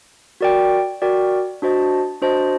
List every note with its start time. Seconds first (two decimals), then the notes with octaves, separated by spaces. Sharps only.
0.41 F#4 A#4 D5 G5
1.02 F#4 A#4 D5 G5
1.62 D4 F#4 C5 D#5 A5
2.22 D4 F#4 C5 D#5 A5